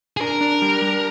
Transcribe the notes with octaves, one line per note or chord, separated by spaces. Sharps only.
G#4
D4 A#4
D4
G3
G3